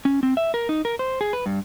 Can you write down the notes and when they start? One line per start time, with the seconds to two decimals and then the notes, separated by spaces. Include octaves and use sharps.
0.05 C#4
0.23 C4
0.37 E5
0.54 A#4
0.69 D#4
0.85 A#4
0.99 C5
1.21 G#4
1.33 B4
1.46 G2